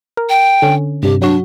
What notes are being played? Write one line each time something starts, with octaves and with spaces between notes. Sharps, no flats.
A#4
G5
D3 C#4
G2 C3 G4
F#3 D4 F#4